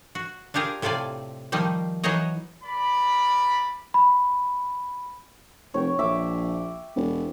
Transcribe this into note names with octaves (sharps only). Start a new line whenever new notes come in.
F#4
D4 F4 G4 G#4 A#4
A2 C3 F4 A4 D5 G#5
D#3 F3 G3 A#3 D#4
E3 F#3 D#4 G#4 C#5 D#5
A#4 D5 B5
B5
F1 C#5 G5
A#1 E5 D6
E1